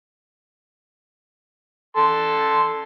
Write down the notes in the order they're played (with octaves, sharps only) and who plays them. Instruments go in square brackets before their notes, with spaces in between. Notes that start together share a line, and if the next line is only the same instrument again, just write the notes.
[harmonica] A4 C6